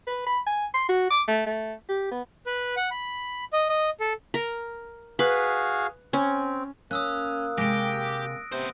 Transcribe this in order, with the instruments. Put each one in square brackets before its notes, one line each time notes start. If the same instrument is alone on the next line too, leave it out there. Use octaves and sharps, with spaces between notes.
[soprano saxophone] B4
B5
G#5
C6
F#4
D6
A3
A3
G4
B3
[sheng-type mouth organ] B4
F#5
B5
D#5
D#5
A4
[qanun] A#4
[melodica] F#4 G#4 F5 [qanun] B4
[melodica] C4 [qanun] C#4
[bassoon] A#3 [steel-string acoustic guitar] C#4 [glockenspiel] D#6 E6 F#6
[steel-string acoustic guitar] C3 G#3 [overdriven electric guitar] G4 [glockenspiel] A#6 D7
[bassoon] C3 [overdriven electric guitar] B3 C5